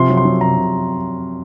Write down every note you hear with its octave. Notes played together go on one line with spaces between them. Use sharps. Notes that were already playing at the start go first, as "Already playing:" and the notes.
Already playing: C3 F3 C6
F#3
C6
F#3
C3 A#5
C3